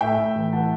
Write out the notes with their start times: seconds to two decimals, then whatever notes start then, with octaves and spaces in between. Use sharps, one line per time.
0.01 A2 E5 G5
0.18 A2
0.35 E3
0.53 E3 F#5 A5